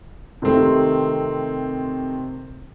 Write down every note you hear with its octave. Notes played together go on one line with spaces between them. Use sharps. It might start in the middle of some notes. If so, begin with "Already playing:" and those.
C3 D#3 A3 C4